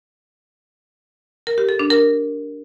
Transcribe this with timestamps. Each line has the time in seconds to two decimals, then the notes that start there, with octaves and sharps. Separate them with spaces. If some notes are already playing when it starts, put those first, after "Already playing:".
1.47 A#4
1.58 G4
1.69 A4
1.79 D4
1.90 A#4